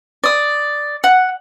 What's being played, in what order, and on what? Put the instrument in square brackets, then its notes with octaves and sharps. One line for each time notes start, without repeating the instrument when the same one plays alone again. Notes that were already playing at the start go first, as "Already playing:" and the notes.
[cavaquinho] D5 D#6
F#5